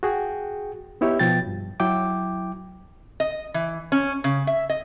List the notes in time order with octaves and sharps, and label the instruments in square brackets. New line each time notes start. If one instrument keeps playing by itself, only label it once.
[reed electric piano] F#4 G#4 G5
B3 D#4 E4 G4 C#5
B2 F3 G5 A6
G2
F#3 E4 G5 D6
[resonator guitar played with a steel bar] D#5
E3
C#4
C#3
E5
D#5